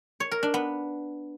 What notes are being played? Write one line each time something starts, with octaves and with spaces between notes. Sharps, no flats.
C#5
A#4
D4
B3